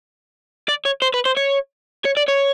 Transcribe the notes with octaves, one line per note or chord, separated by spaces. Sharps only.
D5
C#5
C5
B4
C5
C#5
C#5
D5
C#5